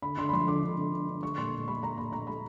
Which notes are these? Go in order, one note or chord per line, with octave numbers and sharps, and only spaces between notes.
D3 B5
D3 C6
B5
F3 C6
D3 D6
D3
D3
D3
D3
G3 C#6
A#2 C6
A#2
G3 B5
G3 A#5
A#2 B5
A#2 A#5
G3 B5